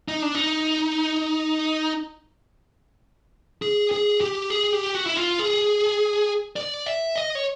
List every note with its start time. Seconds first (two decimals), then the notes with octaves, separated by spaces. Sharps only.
0.08 D#4
0.22 D4
0.35 D#4
3.62 G#4
3.91 G#4
4.21 G4
4.50 G#4
4.73 G4
4.95 F#4
5.06 E4
5.17 F4
5.39 G#4
6.56 D5
6.86 E5
7.16 D#5
7.35 C#5